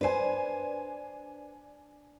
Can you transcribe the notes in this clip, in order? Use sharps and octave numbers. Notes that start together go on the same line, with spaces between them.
D4 B4 C5 G#5